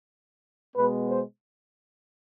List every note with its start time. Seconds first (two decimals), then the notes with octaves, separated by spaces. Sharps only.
0.74 B2 G#3 B3 B4
1.08 C5